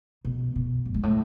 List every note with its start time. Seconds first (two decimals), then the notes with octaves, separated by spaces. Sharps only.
0.25 B2
0.56 B2
0.85 F#2
0.94 G#2
1.03 A2